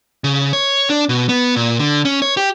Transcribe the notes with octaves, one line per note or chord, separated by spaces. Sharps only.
C#3
C#5
D4
B2
B3
A#2
D3
C#4
C#5
G4